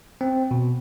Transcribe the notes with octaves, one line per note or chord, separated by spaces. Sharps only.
C4
B2